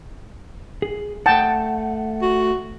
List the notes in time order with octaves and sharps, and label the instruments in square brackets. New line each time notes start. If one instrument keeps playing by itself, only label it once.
[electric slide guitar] G#4
[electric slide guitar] A3 F#5 [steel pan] G5 A5
[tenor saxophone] F#4